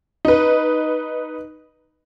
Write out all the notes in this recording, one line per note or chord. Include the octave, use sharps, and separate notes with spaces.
D#4 B4